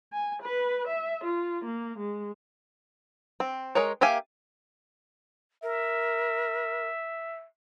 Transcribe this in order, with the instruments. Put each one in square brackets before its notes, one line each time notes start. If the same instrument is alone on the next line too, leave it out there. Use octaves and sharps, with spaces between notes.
[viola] G#5
B4
E5
F4
A#3
G#3
[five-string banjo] C4
G#3 A#4 C#5
A#3 G4 E5 F5 G#5
[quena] A#4 [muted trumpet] E5